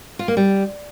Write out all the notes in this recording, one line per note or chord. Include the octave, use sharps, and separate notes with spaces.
F4
A#3
G3